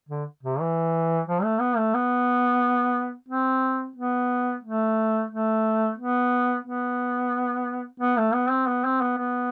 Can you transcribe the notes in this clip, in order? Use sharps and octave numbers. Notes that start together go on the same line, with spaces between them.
D3
C3
E3
F3
A3
B3
A3
B3
C4
B3
A3
A3
B3
B3
B3
A3
B3
C4
B3
C4
B3
B3